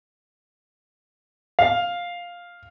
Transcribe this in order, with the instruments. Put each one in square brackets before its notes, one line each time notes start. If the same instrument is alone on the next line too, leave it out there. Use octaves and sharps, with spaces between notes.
[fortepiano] F5